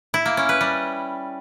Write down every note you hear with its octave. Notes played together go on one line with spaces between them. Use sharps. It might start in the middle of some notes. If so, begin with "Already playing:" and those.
E4
A#3
C#4
B4
G3